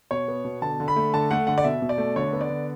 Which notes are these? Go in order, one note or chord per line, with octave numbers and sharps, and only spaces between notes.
B2 C#5
B3
B2
D3 A5
D3
B5
A3
D3 A5
A3 F#5
D3 F#5
D5
B2 E5
B2
D5
A3
D3 C#5
B3
D5
D3